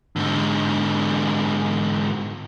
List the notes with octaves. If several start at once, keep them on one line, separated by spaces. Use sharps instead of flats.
G#2 D3